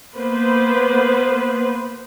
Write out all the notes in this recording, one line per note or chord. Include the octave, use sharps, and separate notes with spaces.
A#3 B3 B4 C5